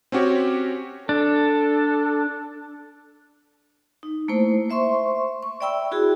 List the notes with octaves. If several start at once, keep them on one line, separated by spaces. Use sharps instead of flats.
C4 C#4 F#4 G4 C#5
D4 A4
D#4
A3 A#3 E4 C5
C5 E5 C6 C#6
C#6
D5 E5 G5 B5 E6
E4 F#4 G#4